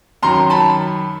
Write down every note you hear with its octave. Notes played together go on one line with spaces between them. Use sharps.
F#2 D#3 F#3 A#5 C6
A5 B5